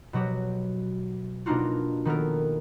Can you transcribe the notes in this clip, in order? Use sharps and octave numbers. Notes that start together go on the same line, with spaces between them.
B2 F#3 F#4 G4
B2 A#3 D4 D#4 F4 F#4
D#3 B3 A4 A#4